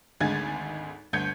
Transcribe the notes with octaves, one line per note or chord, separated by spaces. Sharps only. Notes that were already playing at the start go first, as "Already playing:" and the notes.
G#1 D2 G#3 G#5 G#6 A6
G1 D2 G6 G#6 C#7